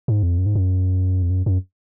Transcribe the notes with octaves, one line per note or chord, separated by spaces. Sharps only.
G#2
F2
F#2
G#2
F#2
F2
F#2
F#2